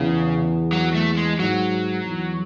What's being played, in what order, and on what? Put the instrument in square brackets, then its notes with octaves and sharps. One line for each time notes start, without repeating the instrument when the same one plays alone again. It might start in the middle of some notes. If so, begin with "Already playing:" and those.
Already playing: [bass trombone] E2 [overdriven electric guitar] C#3
[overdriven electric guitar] F#3
A3
G#3
[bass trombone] G#2 [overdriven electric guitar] F#3
[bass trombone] E2